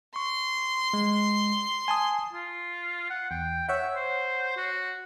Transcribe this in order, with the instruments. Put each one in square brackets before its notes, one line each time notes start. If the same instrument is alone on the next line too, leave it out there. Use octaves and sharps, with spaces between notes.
[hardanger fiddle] C6 [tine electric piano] C#6
[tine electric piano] G#3
G#5 A5 D#6
[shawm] F4
F#5
[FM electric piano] E2 [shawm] G5
[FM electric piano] C#5 F#5 [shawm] E5
[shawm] C5
F#4